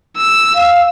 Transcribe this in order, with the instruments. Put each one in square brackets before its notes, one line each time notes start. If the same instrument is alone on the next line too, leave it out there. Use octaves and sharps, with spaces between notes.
[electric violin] E6
[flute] F5